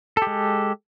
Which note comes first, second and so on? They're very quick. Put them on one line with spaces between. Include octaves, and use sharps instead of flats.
A4 G4 G#3